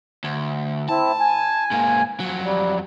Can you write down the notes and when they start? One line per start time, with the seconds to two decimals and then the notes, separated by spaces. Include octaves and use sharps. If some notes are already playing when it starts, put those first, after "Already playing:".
0.24 D2
0.89 C4 E4 A5
1.20 G#5
1.71 G#2 A#3
2.20 F2 F#3
2.44 G3